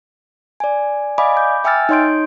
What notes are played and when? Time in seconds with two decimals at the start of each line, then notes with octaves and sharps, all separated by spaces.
0.60 D5 G#5
1.18 D5 D#5 F5 G#5 B5 D6
1.37 B5 D6 G6
1.64 E5 G5 G#5 E6 F6 A6
1.89 D#4 C#5 D#5 C6 G6 D7